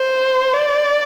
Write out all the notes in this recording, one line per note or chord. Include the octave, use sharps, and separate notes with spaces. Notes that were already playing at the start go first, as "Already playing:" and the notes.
Already playing: C5
D5